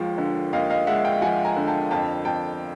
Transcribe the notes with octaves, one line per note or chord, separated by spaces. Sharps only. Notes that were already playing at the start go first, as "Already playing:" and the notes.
Already playing: D#2 F3 G#3
D3
D#2 D#5 F5
D#5 F5
G#3 E5 F#5
F5 G5
F3 F#5 G#5
G#5 A#5
D3
G5 A5
F2 G5 A5
F2 G5 A5